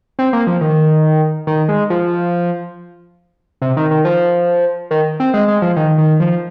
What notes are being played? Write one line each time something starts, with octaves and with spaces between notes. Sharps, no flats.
C4
A#3
F3
D#3
D#3
G#3
F3
C3
D#3
D#3
F3
D#3
C4
G#3
G#3
F3
D#3
D#3
F3